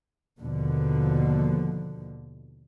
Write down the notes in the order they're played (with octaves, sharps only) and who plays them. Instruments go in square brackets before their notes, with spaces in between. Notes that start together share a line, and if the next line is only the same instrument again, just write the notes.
[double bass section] D#2 B2 D3 F3